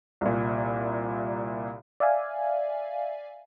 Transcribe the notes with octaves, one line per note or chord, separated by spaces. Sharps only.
C2 A#2
D5 E5 F5 G#5